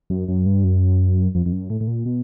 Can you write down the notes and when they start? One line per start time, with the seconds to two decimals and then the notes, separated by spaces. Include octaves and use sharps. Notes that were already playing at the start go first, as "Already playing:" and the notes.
0.10 F#2
0.28 F#2
0.46 G2
0.64 F#2
1.35 F2
1.46 F2
1.52 F#2
1.70 A2
1.81 A2
1.87 A#2
2.06 B2